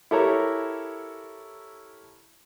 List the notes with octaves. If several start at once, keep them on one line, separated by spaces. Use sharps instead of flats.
E4 G4 A4 A#4 C#5 A#5